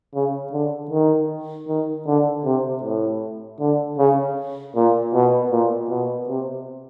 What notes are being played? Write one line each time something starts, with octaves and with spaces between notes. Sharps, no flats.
C#3
D3
D#3
D#3
D3
C3
A2
D3
C#3
A#2
B2
A#2
B2
C3